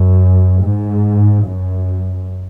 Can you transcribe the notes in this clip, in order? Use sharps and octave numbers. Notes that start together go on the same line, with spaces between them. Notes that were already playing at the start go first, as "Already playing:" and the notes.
Already playing: F#2
G#2
F#2